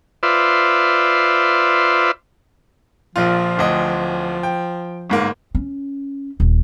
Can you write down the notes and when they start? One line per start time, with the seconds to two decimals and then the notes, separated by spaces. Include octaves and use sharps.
0.23 F4 B4 C5 D5 E5
3.16 A#1 A#2 F3 F4
3.57 D1 D2 D#5
4.43 G5
5.10 G1 G#2 A#3
5.55 C#4
6.40 D#1